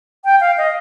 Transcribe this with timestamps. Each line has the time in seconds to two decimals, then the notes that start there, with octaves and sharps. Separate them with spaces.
0.25 G5
0.41 F5
0.58 D#5